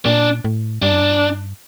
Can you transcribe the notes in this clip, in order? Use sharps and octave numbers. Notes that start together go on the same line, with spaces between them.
A#2 D4
A2
G2 D4
F#2
G2